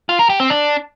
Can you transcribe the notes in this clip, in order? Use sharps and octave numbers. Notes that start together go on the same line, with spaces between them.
F4
A#4
G4
C4
D4